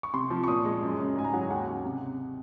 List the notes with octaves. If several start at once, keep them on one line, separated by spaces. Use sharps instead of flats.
C#6
C3 C6
F3
C#6
A#2 D#6
G#3
F#2
C#3
G#2 G#5
A#5
F#3 F#5
G#5
D#2 F#5
C#3
C3